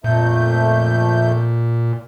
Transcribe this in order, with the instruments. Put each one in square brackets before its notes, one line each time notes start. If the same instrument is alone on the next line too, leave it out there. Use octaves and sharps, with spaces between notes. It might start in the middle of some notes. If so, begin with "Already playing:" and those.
[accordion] F2 A3 G6 [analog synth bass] A#2